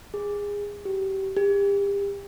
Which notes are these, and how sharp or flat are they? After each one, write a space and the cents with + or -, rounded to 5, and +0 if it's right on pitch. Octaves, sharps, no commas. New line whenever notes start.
G#4 -20
G4 -30
G4 +35